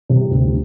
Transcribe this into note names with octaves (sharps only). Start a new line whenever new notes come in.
C3
D2